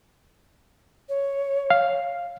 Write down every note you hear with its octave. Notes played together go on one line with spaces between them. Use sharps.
C#5
F5